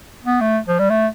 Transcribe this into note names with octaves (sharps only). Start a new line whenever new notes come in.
B3
A3
F3
G3
A3